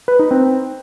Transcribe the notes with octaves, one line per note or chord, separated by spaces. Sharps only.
B4
D#4
C4